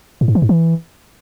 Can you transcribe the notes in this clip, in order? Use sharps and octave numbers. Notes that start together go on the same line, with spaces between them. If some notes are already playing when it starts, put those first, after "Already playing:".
A2
G#2
E3
G#2
E3